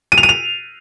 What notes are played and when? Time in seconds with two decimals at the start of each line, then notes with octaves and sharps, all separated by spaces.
0.12 D#7
0.18 F7
0.23 D#7
0.29 F7